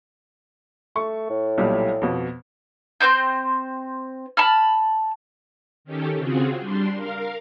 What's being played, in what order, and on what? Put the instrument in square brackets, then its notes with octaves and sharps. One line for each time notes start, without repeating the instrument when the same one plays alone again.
[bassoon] A3 [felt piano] C#6
[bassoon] A2
[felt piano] B1 A#2 G3
F2 B2
[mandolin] C4 C5 C6 G6
A5 B5 F6
[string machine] D#3 C#4 G4 A4
C#3 C4 F4 F#4 G#4
G3 D4 C6
A#4 F5